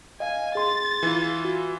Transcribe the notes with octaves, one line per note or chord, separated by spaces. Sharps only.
D#5 F5 G#5
G#4 C6 A6
E3 F4
F#4